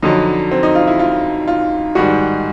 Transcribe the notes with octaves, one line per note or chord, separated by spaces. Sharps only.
F2 D3 F#3 D#4
C4
D#4
F4
E4
F4
F4
G#2 D#3 G3 F#4